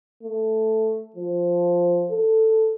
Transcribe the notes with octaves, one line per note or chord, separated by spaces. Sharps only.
A3
F3
A4